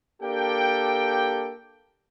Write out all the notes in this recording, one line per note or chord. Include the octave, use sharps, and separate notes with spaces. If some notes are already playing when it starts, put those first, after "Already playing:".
A#3 D4 G4 A4 G5